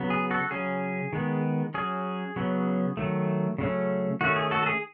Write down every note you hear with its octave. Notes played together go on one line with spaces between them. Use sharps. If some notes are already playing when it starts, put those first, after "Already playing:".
Already playing: C#3 F#3 B3
G#4
F#4 A4
C#3 F#3 C#4 G#4
D#3 G#3 B3
F#3 C#4 G#4
C#3 F#3 B3
D#3 F#3 A3
C#3 F#3 A3 C#4
D#3 A3 C#4 F#4
G#4
F#4 A4
A4
G#4